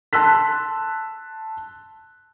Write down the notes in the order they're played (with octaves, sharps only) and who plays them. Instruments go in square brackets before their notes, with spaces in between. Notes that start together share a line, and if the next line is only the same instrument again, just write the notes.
[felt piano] A5 C6 E6 F#6 B6